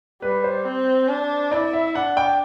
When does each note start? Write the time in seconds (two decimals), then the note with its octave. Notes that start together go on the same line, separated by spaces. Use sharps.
0.22 G3 B4
0.44 C5
0.65 C4
1.08 D4
1.51 E4 D5
1.73 E5
1.95 D4 F#5
2.17 G5